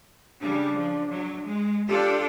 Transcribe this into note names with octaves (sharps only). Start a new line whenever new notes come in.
C#3 G3 D4
F3
F#3
G#3
D4 F4 G4 A4